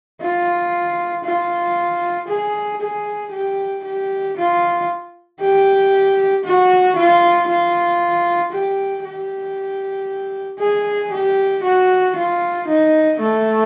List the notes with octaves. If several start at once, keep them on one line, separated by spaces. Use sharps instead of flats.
F4
F4
G#4
G#4
G4
G4
F4
G4
F#4
F4
F4
G4
G4
G#4
G4
F#4
F4
D#4
A3